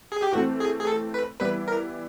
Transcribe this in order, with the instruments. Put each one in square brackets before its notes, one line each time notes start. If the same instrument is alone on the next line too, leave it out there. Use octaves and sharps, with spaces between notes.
[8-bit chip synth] G#4
G4
[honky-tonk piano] E3 A3 C4 [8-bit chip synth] F#4
[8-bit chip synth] G#4
G#4
A4
B4
[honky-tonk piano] E3 G3 B3 E4 [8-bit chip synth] B4
[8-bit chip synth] A#4